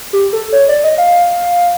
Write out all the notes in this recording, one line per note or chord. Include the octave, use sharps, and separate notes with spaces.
G4
A4
C#5
D5
D#5
F5